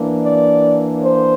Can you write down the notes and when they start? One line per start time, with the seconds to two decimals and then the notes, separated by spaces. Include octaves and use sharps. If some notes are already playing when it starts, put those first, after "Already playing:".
Already playing: E3 A#3 D4
0.24 D5
1.04 C5